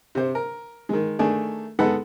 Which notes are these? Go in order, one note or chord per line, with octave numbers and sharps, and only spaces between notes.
C3 C5
A#4
D#3 G#3
D#3 A3 D4 G#4
G#3 B3 D#4 A4 F#5 B5